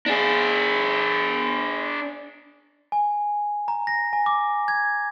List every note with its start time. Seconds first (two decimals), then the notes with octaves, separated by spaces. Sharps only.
0.06 D4 G#4
2.92 G#5
3.68 A#5
3.87 A#6
4.13 G#5
4.26 D6
4.68 G#6